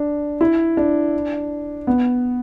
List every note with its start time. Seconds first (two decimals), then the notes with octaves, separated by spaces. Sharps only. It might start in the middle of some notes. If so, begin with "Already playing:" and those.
Already playing: D4
0.41 E4
0.77 D4
1.87 B3